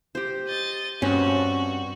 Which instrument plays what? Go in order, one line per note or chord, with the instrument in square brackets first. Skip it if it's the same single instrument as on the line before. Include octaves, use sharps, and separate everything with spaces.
[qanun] G4 C5
[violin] D#5 A6
[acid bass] G2 [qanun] C4 B4 [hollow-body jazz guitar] C#4 [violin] F#4